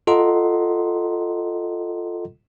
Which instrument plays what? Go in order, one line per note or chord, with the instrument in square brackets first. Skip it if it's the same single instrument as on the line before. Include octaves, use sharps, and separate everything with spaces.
[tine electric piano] F4 A4 D#5 F#5 A#5 C6